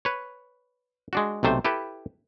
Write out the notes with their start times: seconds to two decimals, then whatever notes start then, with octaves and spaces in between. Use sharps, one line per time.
0.05 B4 C#5
1.13 G#3 D4 F#4
1.43 B1 C3 A3 C5
1.65 E4 G4 A4 B4